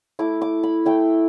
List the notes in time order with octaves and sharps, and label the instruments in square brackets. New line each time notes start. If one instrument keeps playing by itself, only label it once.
[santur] A3 E4 D6
D6
B5
A3 E4 G5